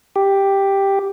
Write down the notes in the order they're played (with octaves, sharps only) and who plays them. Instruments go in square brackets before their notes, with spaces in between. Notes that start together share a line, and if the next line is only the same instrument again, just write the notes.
[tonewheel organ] G4